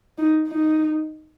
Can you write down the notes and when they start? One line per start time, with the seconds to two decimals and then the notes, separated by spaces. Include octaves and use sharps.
0.18 D#4
0.48 D#4